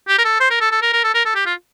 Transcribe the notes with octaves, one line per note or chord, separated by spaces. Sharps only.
G4
A#4
A4
C5
A#4
A4
A4
A#4
A#4
A4
A#4
A4
G4
F4